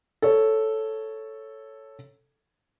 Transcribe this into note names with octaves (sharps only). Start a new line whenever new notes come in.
A4 C#5